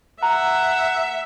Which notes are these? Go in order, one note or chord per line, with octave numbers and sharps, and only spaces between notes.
E5 F#5 A#5